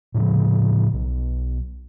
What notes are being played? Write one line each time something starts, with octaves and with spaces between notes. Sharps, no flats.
A2 C#3 F3
B1